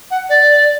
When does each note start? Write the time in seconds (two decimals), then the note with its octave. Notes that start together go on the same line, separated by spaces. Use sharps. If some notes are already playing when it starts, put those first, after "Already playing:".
0.10 F#5
0.29 D5